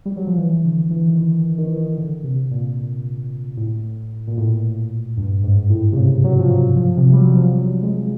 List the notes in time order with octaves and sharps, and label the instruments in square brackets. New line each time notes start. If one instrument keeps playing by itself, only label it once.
[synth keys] G3
F#3
F3
E3
D3
E3
D#3
E3
D#3
E3
D#3
D3
C3
A#2
A2
A#2
A2
G2
G#2
A2
C3
C#3
F#3
F3
F#3
F3
C3
G3
F#3
F#3
F3
F#3
G#3